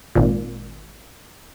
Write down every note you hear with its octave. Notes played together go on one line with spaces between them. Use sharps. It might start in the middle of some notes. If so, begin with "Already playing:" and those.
G#1 A#2